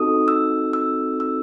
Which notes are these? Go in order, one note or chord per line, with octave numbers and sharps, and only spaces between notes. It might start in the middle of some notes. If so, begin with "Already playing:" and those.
Already playing: C4 D#4 F#4 A4 D#6
E6
E6
E6